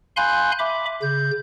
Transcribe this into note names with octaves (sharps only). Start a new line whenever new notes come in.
F5 G#5 B5 C6 F#6 G6
E5 B5 D6
C#3 G6